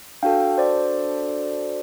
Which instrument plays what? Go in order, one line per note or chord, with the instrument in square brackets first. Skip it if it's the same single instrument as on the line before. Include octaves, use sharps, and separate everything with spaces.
[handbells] D4 F#4 A4 F5 G5
C5 D5